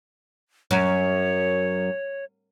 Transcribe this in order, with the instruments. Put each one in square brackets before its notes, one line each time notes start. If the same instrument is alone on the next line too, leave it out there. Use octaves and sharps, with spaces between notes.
[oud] F#2 [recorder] C#5